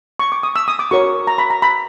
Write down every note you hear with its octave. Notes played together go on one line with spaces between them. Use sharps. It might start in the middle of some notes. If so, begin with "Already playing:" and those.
C#6
D6
D#6
E6
D#6
D6
F#4 A#4 C#5 C#6
A#5
B5
A#5
B5